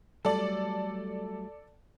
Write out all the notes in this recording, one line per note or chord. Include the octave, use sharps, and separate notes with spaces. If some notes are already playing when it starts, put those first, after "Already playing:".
F#3 G3 A3 A4 D5